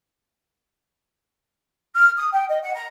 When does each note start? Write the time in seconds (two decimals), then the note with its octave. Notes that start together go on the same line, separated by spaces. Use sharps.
1.95 F6
2.17 D#6
2.33 G5
2.48 D#5
2.62 F#5
2.74 A#5